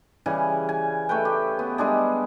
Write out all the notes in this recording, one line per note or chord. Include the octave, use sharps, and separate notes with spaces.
C#3 E3 G3 G#5
G#5
A3 A4 B4 G5
G4
B3
G3 G#3 D4 G#4